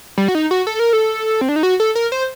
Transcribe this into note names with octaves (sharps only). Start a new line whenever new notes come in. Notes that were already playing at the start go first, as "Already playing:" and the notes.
G3
F#4
D#4
F#4
A4
A#4
A4
C4
D4
D#4
F#4
A4
A#4
C5